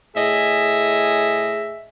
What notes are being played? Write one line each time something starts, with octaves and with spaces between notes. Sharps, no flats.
A2 G#4 D#5 E5